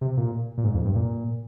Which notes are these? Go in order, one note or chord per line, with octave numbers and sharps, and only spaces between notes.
C3
A#2
A#2
G#2
F2
G2
A#2